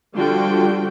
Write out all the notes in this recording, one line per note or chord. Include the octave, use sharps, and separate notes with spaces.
D3 F3 G3 F4 F#4 G5